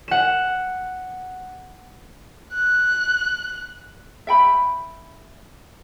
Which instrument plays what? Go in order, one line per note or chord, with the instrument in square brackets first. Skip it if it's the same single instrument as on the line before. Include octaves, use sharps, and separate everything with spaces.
[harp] F#5 E7
[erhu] F#6
[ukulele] E5 G5 B5